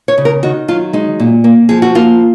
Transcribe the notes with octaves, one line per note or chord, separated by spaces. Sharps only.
C#5
C#3
A#4
D#3 F#4
F#3 F4
G#3 D#4
A#2
A#3
F3 G#4
F#4
A#3 F4